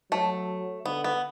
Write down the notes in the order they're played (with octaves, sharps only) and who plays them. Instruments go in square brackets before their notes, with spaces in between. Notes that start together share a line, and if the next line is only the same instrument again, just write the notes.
[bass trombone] F#3 [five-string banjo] A3
[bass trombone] D3 [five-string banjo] B3
[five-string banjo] B3